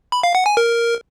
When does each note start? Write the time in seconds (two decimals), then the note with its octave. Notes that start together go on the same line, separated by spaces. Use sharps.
0.12 B5
0.23 F5
0.35 F#5
0.46 G#5
0.57 A#4